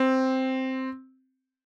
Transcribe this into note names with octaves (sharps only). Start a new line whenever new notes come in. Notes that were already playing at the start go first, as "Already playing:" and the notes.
Already playing: C4